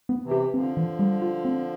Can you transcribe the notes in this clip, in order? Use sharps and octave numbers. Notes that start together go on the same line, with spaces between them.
B3
C3 E3
G4
D3 F3 C4
E3
G3
F4
C4